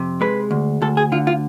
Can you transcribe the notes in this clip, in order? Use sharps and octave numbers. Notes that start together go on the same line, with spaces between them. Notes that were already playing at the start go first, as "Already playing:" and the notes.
Already playing: F2 C3
G#3 B4
D2
D2 A4
G#4
D3 F4
F4